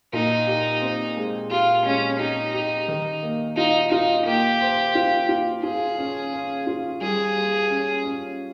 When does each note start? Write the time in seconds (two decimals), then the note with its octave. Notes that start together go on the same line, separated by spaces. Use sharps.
0.13 A#2 D#4
0.47 G4
0.82 C4
1.16 G#3
1.51 F4 G4
1.85 G#3 C#4
2.19 D#4 G4
2.54 G4
2.88 D#3
3.23 A#3
3.57 D#4 F4
3.92 D#4 F4
4.26 A#3 G4
4.61 C5
4.95 F4
5.29 F4
5.63 F4 G#4
5.98 C#4
6.33 C#4
6.67 F4
7.01 G3 G#4
7.36 G3
7.70 C#4
8.05 C#4